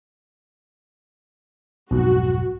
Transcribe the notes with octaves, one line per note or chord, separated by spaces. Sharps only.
B1 F2 G#2 F#4